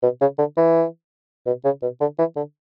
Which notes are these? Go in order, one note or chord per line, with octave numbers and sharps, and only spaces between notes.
B2
C#3
D3
E3
B2
C#3
B2
D3
E3
D3